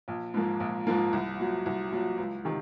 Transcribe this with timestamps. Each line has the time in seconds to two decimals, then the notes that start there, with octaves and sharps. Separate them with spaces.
0.08 A#1
0.34 G#2 F3 A#3
0.60 A#1
0.87 G#2 F3 A#3
1.13 C2
1.39 A#2 F#3
1.66 C2
1.92 A#2 F#3
2.18 C#2
2.45 C3 D#3